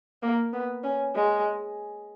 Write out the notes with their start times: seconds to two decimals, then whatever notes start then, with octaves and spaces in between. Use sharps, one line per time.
0.22 A#3
0.53 B3
0.84 C#4
1.15 G#3